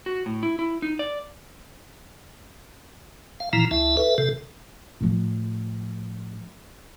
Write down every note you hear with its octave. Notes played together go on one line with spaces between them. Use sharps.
F#4
A2
E4
E4
D#4
D5
F5
A#2 E3 F3 E4 A#5
C#2 E4 E5 A5
A4 B4 E5
C3 A4
A2 F3